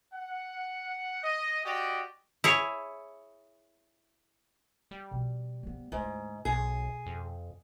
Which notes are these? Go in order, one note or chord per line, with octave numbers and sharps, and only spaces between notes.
F#5
D#5
F#4 G4 D5 D#5
E4 G#4 C#5
G3
B2 F3
F3 B3
D2 G#2
B1 B2 G#4
F2